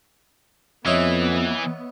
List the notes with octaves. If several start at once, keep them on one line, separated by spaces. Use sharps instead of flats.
F2 E3 B3 C#5 D#5 E5